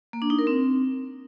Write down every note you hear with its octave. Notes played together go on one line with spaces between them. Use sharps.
A#3
D4
D#4
A#4
C4